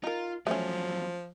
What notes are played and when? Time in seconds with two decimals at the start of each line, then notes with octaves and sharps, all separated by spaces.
0.04 D#4 F4 A#4
0.47 E2 F3 F#3 A3 C#4